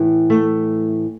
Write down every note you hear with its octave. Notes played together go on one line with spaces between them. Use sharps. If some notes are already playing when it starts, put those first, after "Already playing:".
Already playing: A2 E3
A3